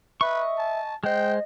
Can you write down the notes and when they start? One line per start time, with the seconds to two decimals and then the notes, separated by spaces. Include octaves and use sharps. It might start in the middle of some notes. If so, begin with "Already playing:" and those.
0.21 B4 D#5 E5 C#6
0.58 A5
1.04 G#3 C5 D#5 G5